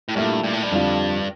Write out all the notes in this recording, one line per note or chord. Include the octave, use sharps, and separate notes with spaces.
A2
G2 A#2 A3 E4
G2
A2
G2
F2 D3 G3 D4 F4